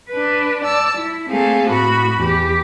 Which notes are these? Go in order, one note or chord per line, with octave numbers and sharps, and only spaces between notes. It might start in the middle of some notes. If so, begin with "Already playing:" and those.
D4 B4
D5 A5 E6
E4
A3 A#3 C4 G#4 A4 F5
A2 F#4 B5
E2 G4